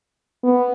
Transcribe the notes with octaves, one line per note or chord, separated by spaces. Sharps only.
B3